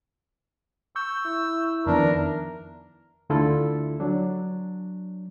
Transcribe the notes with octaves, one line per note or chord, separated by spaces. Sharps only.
C#6 E6 G6
E4
F2 D#3 B3 D4 A#4
D2 D3 E4 F4 A4
F#3 D4